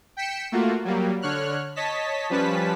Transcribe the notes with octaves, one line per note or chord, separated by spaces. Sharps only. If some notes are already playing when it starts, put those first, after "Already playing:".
G5 B6 C#7 E7
A3 A#3 F4 F#4
F#3 G3 A#3
D3 C#5 F6 F#6
C#5 D#5 A5 B6
F3 G3 C#4 B4 A5 B6